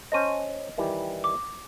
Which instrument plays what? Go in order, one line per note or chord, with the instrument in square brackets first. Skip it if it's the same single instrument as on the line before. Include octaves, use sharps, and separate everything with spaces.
[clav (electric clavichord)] C#4 C5 A5 [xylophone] D#5 D#7
[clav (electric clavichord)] D#3 E3 G3
[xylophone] D6